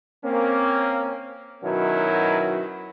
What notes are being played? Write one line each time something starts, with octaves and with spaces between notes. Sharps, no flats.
A#3 C4 C#4
B2 D#3 F#3 B3 C#4 E4